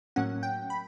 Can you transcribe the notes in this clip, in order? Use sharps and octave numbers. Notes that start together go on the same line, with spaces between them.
A2 F#3 A#3 C#4 F#5
G5
B5